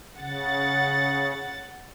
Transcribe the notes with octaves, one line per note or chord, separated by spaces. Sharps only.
C#3 F#5 A6